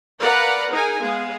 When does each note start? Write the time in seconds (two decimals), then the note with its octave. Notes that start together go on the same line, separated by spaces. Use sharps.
0.21 A#4 B4 D5 F5 F#5 A#5
0.71 D#4 G#4 A#4 G#5
1.01 G#3 B3 G#4 F5